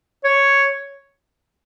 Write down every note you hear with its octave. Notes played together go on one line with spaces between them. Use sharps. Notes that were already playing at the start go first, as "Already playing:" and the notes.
C#5